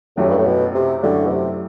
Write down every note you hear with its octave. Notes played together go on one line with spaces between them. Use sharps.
F#2 A2 F#3 A3 E4 G4
G2
A2
B2
C3
F#2 D3 F#3 A3 E4 G4
B2
C3